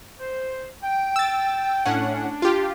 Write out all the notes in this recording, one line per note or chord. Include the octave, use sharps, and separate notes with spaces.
C5
G5
E6 A6
A2 C#4 D4 F#5
F4 G4